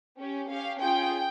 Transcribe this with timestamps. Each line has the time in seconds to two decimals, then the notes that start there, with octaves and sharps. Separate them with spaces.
0.18 C#4 G4
0.49 C#4 G4 F5
0.80 C#4 F4 G#4 G5